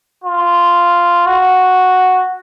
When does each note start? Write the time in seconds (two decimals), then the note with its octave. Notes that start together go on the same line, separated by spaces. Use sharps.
0.24 F4
1.26 F#4